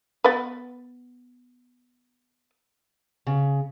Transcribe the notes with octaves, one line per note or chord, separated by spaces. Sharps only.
B3 B4
C#3